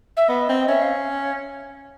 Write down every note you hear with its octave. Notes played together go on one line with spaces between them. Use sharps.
E5
B3 D#5
C4
C#4 E5
F5